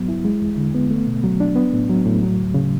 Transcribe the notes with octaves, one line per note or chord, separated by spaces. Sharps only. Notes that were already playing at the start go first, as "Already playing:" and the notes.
Already playing: G#2 F#3 B3
E4
G#3
E2
D3
B3
A3
B2
F#3
D4
B3
A2
F#3
A2
F#3
D2
C#3